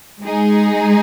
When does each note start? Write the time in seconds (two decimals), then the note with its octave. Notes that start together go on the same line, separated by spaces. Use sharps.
0.22 G#3 D#4 G#4